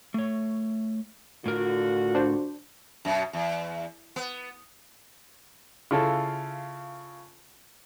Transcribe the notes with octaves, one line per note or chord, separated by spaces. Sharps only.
A3 C#5
A2 D3 F4 F#4 A#4
D4 C5
F#2 B2
E2
B3
C#3 E4 F4 A4